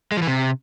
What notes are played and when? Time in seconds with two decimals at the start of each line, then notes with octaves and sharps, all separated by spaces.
0.12 G#3
0.17 F3
0.22 E3
0.27 C3